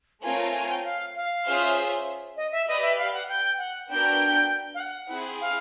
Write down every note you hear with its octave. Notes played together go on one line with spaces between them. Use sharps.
A3 C4 F4 A#4 C#5 G#5
G#5
G5
F5
F5
C#4 F4 G#4 C5 E5
D#5
E5
G4 B4 D5 D#5
E5
F5
F#5
G5
F#5
B3 D4 F#4 A#4 G5
F5
F#5
C4 E4 G#4
F5